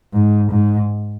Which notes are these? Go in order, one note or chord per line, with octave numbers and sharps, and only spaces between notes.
G#2
G#2